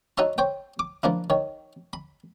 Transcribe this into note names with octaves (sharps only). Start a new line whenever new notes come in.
D#4 F#4 C#5 E5 A5 C6
C5 C#5 G5
D6
F3 A#3 D4 E4
D#3 C#5
B5